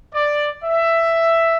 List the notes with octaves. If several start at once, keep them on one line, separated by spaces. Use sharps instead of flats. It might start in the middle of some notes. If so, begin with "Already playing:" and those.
D5
E5